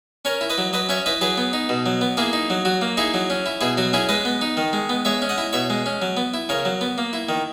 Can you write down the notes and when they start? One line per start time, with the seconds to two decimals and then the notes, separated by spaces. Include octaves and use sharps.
0.25 C#4 A#4 C#5
0.41 E4
0.50 B4 D#5
0.58 F#3
0.73 F#3 B4 D#5
0.89 C#4 C#5 E5
1.06 E4 B4 D#5
1.21 F#3 G#4 B4
1.38 B3
1.53 D#4
1.69 B2
1.86 F#3
2.01 B3
2.17 A#3 E4 G#4
2.33 D#4
2.50 F#3
2.65 F#3 F#4
2.82 A#3
2.97 D#4 E4 G#4
3.14 F#3
3.30 C#4
3.46 E4
3.61 B2 E4 G#4
3.77 F#3 F#4
3.93 C#4 E4 G#4
4.09 G#3 B4 D#5
4.25 B3
4.41 D#4
4.57 D#3
4.73 G#3
4.89 B3
5.05 G#3 C#5 E5
5.22 C#4
5.29 D#5 F#5
5.38 E4
5.53 B2 C#5 E5
5.70 G#3
5.86 C#4
6.02 F#3
6.17 B3
6.34 E4
6.49 C#3 A#4 C#5
6.65 F#3
6.81 B3
6.98 A#3
7.13 E4
7.29 D#3